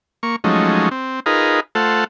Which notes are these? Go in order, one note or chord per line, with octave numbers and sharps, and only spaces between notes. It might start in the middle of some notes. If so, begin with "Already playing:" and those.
A#3 C#6
F3 F#3 G#3 A3 C#4 D#4
C4
D#4 F4 G#4 A#4 B4
A3 F4 A4 C5 F#5